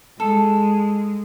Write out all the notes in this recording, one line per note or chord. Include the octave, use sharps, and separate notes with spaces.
G#3 A4